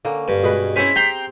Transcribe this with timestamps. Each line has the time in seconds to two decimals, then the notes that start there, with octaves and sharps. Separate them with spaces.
0.05 D3 A#3 C#4
0.28 G2
0.43 B2 G#3 B4
0.76 C4 C#4 E4 C5 B6
0.96 C4 G4 G5 A#5 C6